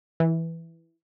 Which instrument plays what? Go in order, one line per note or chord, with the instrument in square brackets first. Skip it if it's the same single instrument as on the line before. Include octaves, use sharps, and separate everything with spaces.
[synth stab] E3